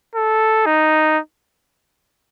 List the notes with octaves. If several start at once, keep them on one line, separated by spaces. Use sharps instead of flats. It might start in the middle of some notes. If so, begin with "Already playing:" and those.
A4
D#4